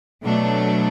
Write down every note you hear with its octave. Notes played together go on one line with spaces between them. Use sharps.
B2 F#3 A3 D4